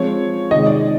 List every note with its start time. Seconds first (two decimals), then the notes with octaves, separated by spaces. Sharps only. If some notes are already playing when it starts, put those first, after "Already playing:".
Already playing: F3 G#3 C4 F4 C#5
0.51 C3 D#3 G#3 D#5
0.66 D5